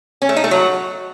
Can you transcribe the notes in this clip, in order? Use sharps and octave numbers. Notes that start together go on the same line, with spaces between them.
C#4
A3
D#4
A3
F#3